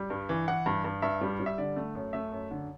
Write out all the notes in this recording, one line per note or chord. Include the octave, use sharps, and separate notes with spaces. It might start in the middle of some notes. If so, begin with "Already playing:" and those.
Already playing: G3
G2
E3
E3 F#5
G2
G2
G2 E5
G3
G3
E5
D3 D5
A3
F#2
A3 E5
F#2
D3